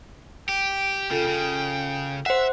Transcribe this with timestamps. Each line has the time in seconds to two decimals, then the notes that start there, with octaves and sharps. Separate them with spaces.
0.49 G4 G5
1.11 C#3 F4 A4
1.27 C#3
2.26 C5 E5 F#5